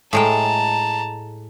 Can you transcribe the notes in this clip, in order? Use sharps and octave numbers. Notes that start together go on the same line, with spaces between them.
A2 G#3 G5 A5 A#5